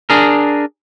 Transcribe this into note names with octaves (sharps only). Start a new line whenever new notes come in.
D4 G#4 A#4